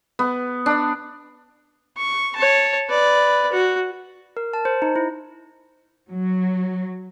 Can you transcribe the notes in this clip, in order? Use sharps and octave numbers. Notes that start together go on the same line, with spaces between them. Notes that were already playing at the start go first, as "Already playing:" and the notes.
B3
D4
C#6
C#5 A5
B4 D5
F#4
A#4
A5
C5
D#4
E4
F#3